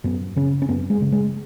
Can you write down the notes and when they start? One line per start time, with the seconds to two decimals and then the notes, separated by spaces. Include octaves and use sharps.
0.04 F#2 B3
0.36 C#3 C#4
0.62 C#4
0.69 F#2 B3
0.90 G#3
1.01 C#3
1.12 G#3